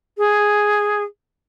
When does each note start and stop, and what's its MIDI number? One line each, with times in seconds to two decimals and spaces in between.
0.18 1.04 68